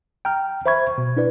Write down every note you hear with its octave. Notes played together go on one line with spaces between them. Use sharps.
G5 A#5 F6
C5 E5 B5 C#6 G#6
B2
D4 E4 B4 D5